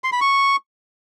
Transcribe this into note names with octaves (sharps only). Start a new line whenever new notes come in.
C6
B5
C#6